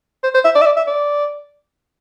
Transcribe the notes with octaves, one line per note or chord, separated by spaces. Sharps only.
C5
C5
E5
D5
E5
D5
E5
D5